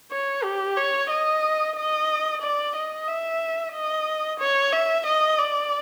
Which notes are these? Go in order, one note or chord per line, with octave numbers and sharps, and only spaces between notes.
C#5
G4
C#5
D#5
D#5
D5
D#5
E5
D#5
C#5
E5
D#5
D5